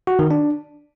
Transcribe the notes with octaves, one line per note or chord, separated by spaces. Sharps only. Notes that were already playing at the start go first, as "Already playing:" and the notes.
F#4
D#3
D4